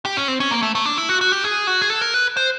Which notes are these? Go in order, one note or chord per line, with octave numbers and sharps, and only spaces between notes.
G4
C#4
C4
C#4
A#3
A3
A3
D4
E4
F#4
F#4
G4
G#4
F#4
G#4
A4
A#4
B4
C5